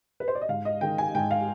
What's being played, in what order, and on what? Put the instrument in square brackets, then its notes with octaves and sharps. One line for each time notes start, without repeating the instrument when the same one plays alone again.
[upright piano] B4
C5
D5
D#5
G#2 F5
D#5
D#3 G#3 G5
G#5
G#2 G5
F5